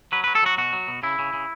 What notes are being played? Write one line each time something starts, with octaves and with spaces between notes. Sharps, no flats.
F#3 B4
F#3 B4
A4
F#3 F#4
B2 F#4
F#3
B2
C#3 E4
C#3
C#3